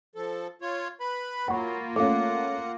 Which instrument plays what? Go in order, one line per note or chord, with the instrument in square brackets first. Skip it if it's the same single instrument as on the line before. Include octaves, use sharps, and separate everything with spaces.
[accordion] F3 A4
F4 C#5
B4 B5
[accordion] F#3 [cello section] A#3 F4 [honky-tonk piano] F#5 [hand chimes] B5 C#6
[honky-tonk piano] A3 C#4 [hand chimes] F5 D6 [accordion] F#5